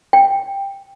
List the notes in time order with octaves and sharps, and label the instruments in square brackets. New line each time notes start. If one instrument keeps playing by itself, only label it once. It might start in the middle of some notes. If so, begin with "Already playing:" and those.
[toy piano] G5